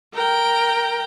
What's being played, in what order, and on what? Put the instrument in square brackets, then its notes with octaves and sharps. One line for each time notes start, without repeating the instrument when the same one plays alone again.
[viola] A#4 G5